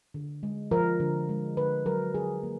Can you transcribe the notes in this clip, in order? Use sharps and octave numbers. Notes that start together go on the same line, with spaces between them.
D3
G#3
F3 A#4
D3
G#3
D3 B4
F#3 A#4
D3 G#4
A#3